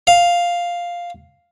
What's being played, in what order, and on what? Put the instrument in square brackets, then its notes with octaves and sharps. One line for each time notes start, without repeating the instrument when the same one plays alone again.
[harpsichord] F5